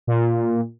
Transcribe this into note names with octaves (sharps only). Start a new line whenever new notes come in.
A#2